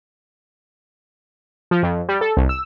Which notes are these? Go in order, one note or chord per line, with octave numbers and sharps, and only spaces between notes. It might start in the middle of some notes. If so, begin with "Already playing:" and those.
F3
F2
G3
A4
C2
E6